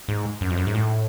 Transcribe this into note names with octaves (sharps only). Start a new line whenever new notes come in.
G#2
F#2
F2
F#2
G#2
A2